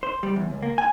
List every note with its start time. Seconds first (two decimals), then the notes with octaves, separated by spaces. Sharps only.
0.03 C5
0.23 G3
0.36 E2
0.50 C#2
0.63 A#3
0.78 G#5